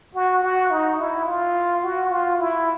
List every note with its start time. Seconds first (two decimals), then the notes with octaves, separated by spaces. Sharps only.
0.15 F#4
0.43 F#4
0.71 D#4
0.99 E4
1.27 F4
1.83 F#4
2.11 F4
2.40 E4